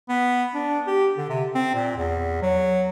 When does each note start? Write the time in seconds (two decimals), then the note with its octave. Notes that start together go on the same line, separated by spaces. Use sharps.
0.09 B3
0.54 D4
0.87 G4
1.17 D3
1.30 C3
1.55 C4
1.75 A#2
1.97 E2
2.42 F#3